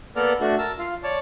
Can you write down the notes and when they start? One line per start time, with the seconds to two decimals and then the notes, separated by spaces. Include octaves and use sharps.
0.16 A#3 B3 A4 A#4 D5 F6
0.41 A3 D4 F#4
0.58 A#4 A5 E6
0.79 F4 F5
1.03 C#5 D5 A5